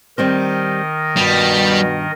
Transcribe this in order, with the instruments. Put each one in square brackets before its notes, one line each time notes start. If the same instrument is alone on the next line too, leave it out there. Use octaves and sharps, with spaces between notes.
[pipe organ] D#3 A#4 D#5 [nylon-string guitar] G3 C4 C5
[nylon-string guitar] G2 [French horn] B2 [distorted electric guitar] G3